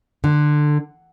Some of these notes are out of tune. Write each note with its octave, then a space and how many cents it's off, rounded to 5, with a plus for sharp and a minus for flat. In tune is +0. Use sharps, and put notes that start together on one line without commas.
D3 +20